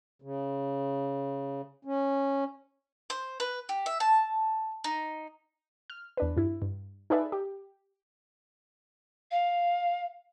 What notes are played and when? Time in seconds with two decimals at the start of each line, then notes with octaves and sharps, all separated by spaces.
0.22 C#3
1.85 C#4
3.10 C5
3.40 B4
3.69 G4
3.86 E5
4.00 A5
4.84 D#4
5.90 F6
6.17 E2 D4 B4
6.37 G2 E4
6.62 G2
7.10 D#4 G#4 A4 B4 D5 E5
7.32 G4
9.31 F5